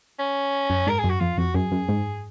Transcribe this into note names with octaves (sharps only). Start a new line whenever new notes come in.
C#4
F#2
G#2 A#4
G#4
F#2
F#4
F2 F4
F2 F#4
F#2 G#4
F#2
G#2